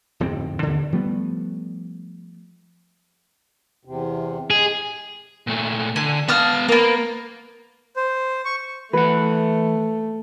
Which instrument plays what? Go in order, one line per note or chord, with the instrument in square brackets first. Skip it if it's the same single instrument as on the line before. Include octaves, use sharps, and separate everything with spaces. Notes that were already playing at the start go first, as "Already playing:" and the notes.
[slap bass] D1 F2 G#2 C4
D#2 D3
F3 G3 A3 B3
[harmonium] E2 C3
[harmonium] G#3 [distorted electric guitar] G#4
[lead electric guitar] A#2 A3
[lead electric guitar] D3 [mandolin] G#5
[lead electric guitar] B3 F5 [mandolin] A5 D#6 F6
[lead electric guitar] A#3 [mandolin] B3 A#4
[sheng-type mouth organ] C5
C#6
[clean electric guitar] E3 F#5 [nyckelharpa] A3 [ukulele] B4